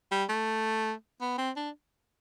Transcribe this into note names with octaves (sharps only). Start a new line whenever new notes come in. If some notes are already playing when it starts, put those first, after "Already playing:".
G3
A3
B3
C4
D4